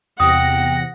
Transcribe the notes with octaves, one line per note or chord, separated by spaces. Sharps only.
E2 C3 F#5 G5 D#6 A#6